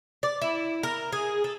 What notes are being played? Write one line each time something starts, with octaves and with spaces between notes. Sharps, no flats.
D5
E4
A#4
G#4
A4